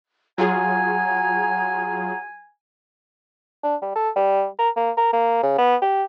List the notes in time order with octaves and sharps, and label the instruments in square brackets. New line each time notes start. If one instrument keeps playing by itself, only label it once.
[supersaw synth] F#3 F4 G#4 [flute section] F#5 A#5 G#6 [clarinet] G#5
[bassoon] D4
G3
A4
G3
A#4
A#3
A#4
A#3
C#3
B3
G4